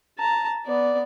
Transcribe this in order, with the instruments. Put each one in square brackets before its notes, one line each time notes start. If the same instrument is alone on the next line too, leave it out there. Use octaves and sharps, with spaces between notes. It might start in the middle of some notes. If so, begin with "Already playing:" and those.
[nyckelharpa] A5 A#5
B3 D5